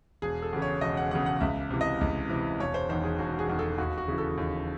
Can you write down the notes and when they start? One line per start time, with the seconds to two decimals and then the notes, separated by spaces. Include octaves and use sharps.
0.22 E1 G#4
0.42 A4
0.53 E2 C#3
0.62 C#5
0.81 E1 D#5
0.97 F#5
1.11 E2 C#3 F#5
1.26 F#5
1.41 C#2 E5
1.71 C3 E3
1.81 D#5
2.01 C#2
2.30 C3 E3
2.59 E1 C#5
2.74 C5
2.89 E2 D#3 C5
3.04 G#4
3.19 E1 F#4
3.39 G#4
3.49 E2 D#3
3.59 A4
3.78 D#2 F#4
3.98 F#4
4.08 C#3 E3
4.18 A4
4.38 D#2